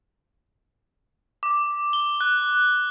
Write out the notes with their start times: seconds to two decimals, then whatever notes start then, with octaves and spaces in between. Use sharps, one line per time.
1.43 D6
1.93 G7
2.21 F#6